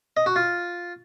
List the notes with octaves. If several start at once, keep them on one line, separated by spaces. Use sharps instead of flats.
D#5
F#4
F4